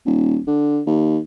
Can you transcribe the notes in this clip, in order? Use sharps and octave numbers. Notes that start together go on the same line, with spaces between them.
D#1
D3
D#2